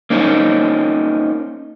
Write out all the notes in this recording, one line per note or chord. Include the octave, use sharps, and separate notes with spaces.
A#3 C#4 D#4 C5